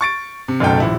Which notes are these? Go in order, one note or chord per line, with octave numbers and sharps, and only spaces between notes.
C#6 A6 D7
C3
F#1 B1 F#2 A3 A4 G5
D#1 A#1 E4